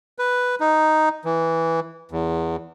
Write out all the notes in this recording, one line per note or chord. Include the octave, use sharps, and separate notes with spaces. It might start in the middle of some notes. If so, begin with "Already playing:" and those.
B4
D#4
E3
E2